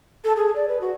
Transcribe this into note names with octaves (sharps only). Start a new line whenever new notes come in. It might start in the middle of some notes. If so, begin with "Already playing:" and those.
A4
G#4
D5
B4
F#4